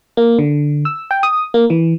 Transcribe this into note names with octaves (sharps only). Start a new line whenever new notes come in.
A#3
D3
E6
G5
D#6
A#3
E3